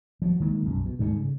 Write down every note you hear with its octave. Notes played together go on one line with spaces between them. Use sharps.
F3 F#3
D#3 G#3 A#3
B1 F#2
B2
D2 G#2 G3 A3
C#3